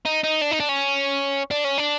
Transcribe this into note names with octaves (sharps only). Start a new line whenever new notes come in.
D#4
D#4
D4
D#4
D4
C#4
D4
C#4
D4